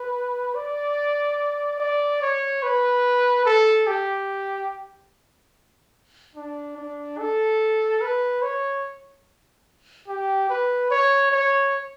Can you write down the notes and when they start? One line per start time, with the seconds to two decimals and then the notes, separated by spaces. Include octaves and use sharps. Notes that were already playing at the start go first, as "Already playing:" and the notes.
Already playing: B4
0.55 D5
1.80 D5
2.22 C#5
2.63 B4
3.46 A4
3.87 G4
6.35 D4
6.77 D4
7.19 A4
8.01 B4
8.42 C#5
10.08 G4
10.50 B4
10.90 C#5
11.32 C#5